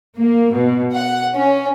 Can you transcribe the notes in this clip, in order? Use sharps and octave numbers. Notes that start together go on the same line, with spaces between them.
A#3
B2
F#5
C#4